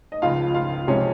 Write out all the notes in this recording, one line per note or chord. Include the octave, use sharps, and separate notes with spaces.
D#5
C#2 C#3 F3 F4 F5
F4 F5
C2 C3 F3 G#3 C#4 C#5